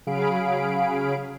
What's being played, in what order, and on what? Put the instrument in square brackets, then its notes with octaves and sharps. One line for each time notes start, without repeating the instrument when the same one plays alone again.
[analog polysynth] C#3 F#3 G#4 F5 B5 D7